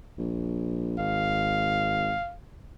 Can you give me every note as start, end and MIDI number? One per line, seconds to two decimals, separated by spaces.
0.18 0.94 34
0.98 2.19 32
0.98 2.33 77